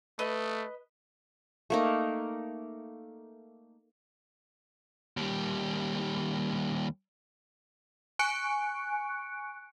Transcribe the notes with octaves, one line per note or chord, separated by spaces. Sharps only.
A3 B4 D#5
A3 A#3 D#4
D#2 G3
G#5 C#6 F#6 C#7 D7